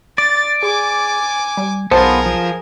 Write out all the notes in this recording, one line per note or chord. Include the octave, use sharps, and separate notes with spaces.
D5 A6
G#4 G#5 D6
G3
B1 B3 F4 G#4 A#4 C5 A5
F3